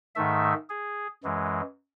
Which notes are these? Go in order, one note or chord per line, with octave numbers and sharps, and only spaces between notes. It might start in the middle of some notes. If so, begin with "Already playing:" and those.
G#2 D#3 A3 E5
G#4
F#2 E3 G#3